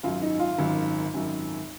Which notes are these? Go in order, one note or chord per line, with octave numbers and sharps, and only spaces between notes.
G#1 F#2 D#3 F#3 F4
D#4
F4
G#1 F#2 D#3 F#3
G#1 F#2 D#3 F#3